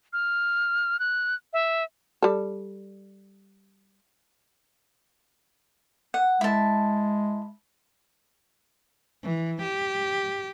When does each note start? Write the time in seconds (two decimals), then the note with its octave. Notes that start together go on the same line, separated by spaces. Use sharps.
0.13 F6
1.00 F#6
1.53 E5
2.22 G3 A4
6.14 F#5
6.41 G#3 E4 A5
9.24 E3
9.62 G4